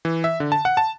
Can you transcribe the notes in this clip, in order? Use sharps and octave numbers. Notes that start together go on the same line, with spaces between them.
E3
E5
D3
A5
F#5
A5